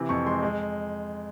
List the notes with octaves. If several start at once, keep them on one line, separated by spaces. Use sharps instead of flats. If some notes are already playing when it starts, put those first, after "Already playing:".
Already playing: C3 E3
F2 C#6
G#3 C6
G#3